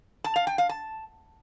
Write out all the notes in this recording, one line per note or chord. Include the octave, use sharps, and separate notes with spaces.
A5
F5
G5
F5
A5